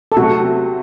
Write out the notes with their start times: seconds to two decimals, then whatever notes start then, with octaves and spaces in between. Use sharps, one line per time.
0.12 A4
0.17 C3 F#3 A3 F#4